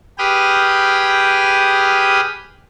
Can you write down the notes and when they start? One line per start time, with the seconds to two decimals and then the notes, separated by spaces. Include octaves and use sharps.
0.18 G4 G#4 B4 G5 D#6 F6